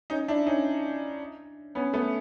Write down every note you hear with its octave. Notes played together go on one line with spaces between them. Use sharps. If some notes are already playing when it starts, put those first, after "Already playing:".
C#4 D#4
D4 E4
C#4 D#4
B3 C#4
A3 B3